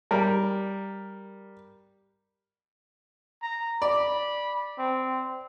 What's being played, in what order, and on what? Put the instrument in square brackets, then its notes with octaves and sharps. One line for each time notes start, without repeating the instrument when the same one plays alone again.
[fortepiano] G3 A#4
[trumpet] A#5
[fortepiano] D5 [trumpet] B5
[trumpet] C4